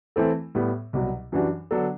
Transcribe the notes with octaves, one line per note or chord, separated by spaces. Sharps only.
E3 A3 C4 E4 A4
A2 G3 B3
C2 B2 F#3
F#2 E3 G3 D4 F#4
D3 F#3 B3 D4 A4